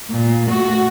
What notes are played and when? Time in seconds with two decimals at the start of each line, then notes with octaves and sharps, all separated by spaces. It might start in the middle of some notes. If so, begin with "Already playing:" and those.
0.11 A#2
0.48 A3 F#4